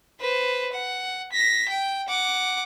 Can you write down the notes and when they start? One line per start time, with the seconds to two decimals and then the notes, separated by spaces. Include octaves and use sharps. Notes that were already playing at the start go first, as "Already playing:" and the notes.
0.20 B4 C5
0.73 F#5
1.33 A#6 B6
1.69 G5
2.08 F#5 D6